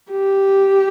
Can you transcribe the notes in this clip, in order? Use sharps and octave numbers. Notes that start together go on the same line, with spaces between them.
G4